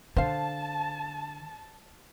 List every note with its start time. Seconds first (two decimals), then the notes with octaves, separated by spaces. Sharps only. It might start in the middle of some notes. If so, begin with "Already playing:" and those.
0.16 D3 C5 F5 A5